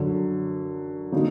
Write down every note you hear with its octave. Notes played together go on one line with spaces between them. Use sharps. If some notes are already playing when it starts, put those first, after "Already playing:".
Already playing: F#2 D3 F#3
D3 F#3 A#3 D#4